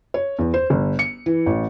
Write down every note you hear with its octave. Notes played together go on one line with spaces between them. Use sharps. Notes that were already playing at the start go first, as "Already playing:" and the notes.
C#5
E2
C5
G1
C#7
E3
A1